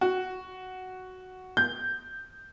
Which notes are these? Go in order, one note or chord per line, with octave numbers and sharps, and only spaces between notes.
F#4
G6